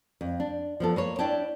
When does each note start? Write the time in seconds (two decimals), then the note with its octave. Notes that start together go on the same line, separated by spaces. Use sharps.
0.21 F2
0.40 D4
0.80 F3 B3 A4
0.96 A#3 B4 C#5
1.19 D4 E4 C#5 D5 G5 A5